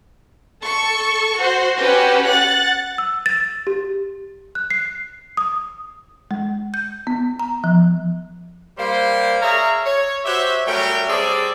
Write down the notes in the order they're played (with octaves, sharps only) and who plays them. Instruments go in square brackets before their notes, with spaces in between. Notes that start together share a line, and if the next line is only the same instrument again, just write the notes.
[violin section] A4 C#6
F#4 C5
C#4 F#4 G4 B4
F#5 F#6 A6
[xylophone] E6
A6
G4
F#6
C7
D#6
[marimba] G#3
G6
B3
A#5
F3
[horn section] G3 A#3 C5
G#4 A#4 C#5 E5 A#5
C#5
F#4 G4 C5 C#5 E5
F#3 G3 A3 C#4 A#4 G5
G3 C4 G#4 A4 D5